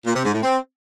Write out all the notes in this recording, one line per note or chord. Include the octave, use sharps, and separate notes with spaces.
A#2
C3
G#2
A2
C4